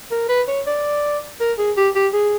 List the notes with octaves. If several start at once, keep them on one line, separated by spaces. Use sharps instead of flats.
A#4
B4
C#5
D5
A#4
G#4
G4
G4
G#4